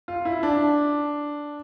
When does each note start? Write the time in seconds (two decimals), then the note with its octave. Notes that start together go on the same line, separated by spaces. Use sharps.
0.08 F4
0.25 E4
0.43 D4